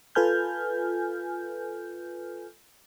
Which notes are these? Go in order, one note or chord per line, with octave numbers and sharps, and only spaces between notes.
F4 A4 B4 G#5 F6 G6